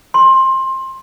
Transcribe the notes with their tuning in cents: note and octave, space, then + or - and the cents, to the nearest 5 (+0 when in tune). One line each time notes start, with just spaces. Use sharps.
C6 +20